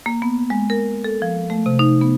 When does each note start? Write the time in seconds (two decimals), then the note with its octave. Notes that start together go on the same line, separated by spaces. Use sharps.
0.06 A#3
0.22 B3
0.50 G#3
0.70 A#4
1.04 A4
1.22 F3
1.50 A3
1.66 C3
1.79 D#4
2.01 B3